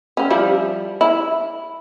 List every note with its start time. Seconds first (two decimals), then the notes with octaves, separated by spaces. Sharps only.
0.17 C4 C#4
0.30 F3 G3 E4
1.01 E4